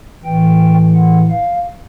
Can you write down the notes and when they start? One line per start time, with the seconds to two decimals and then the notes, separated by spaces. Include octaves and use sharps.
0.24 A2 E3 G5
0.95 F#5
1.30 F5